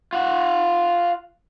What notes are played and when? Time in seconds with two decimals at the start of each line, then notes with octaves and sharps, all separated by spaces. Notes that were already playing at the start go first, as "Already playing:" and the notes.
0.13 F4 F#5